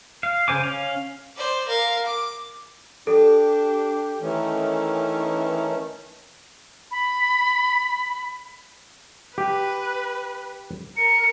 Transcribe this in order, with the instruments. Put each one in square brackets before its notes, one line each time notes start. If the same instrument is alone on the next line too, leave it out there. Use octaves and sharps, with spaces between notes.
[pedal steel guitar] F5
C#3 C5 G#5 D6
C#4 F5
[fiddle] C5 D5
A#4 F5
D6
[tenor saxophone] D4 [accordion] G4 [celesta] A4
[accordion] D#3 A3 C#4 [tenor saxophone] E3
[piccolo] B5
[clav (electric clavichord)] G4 [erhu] B4
[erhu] A#4 [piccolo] C#7